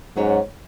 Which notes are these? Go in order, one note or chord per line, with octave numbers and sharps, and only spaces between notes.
G#2 F#3 C#4 F#4 C#5